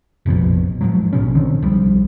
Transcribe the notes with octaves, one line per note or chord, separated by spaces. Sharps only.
F1 A#1 B2 F3
G#2 F3 F#3
A#1 B2 C#4
D3 D#3 C4
B1 F3 G3